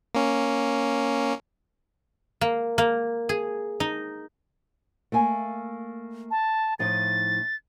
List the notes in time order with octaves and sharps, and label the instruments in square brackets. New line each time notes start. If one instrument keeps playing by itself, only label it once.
[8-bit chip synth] A#3 C#4
[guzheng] A#3
A#3
G#4
D#4
[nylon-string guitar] A3 A#3 G#5
[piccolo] A5
[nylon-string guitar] A2 F3 D#4 [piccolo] A6